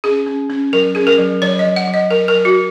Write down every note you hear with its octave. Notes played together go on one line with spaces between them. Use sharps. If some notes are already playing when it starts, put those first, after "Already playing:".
C#4 G#4
C#4
C#4
F#3 A#4
C#4 G#4
A#4
F#3
F#3 C#5
D#5
F#3
F#5
F#3
D#5
F#3 A#4
A#4
F#3
F#4